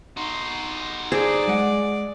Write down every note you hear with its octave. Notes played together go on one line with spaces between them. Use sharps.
D#4 F#4 C6
G#4 A4 C5 D5
G#3 F#5